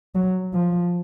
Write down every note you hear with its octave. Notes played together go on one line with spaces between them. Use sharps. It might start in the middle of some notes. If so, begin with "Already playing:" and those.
F#3
F3